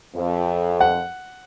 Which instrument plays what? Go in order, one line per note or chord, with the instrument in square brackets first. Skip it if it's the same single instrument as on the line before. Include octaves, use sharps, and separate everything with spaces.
[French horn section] F2
[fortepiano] F#5